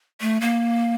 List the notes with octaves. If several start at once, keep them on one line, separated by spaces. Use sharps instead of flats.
A3
A#3